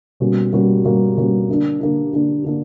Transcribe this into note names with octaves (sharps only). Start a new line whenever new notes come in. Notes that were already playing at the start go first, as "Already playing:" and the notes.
B2 G3 A#3 C#4 F#4
B2 G3 A#3 C#4 F#4
B2 G3 A#3 C#4 F#4
B2 G3 A#3 C#4 F#4
D3 A#3 D4
D3 A#3 D4
D3 A#3 D4
D3 A#3 D4